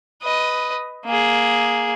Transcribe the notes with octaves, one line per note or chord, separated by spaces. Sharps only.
B4 D#5
A#3 G#4